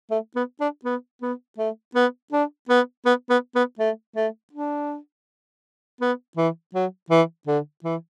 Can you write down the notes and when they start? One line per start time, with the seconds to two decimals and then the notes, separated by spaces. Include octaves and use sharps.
0.11 A3
0.36 B3
0.60 D4
0.85 B3
1.22 B3
1.58 A3
1.95 B3
2.32 D4
2.69 B3
3.06 B3
3.30 B3
3.55 B3
3.79 A3
4.16 A3
4.53 D4
6.01 B3
6.37 E3
6.75 F#3
7.10 E3
7.47 D3
7.84 E3